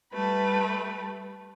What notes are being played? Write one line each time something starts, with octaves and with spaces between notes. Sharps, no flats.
G3 A3 B4